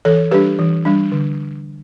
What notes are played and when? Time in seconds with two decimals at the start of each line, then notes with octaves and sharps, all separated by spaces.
0.05 E3 A4 C#5
0.31 G3 D4 G4 B4
0.59 E3
0.85 G3 D4
1.12 D3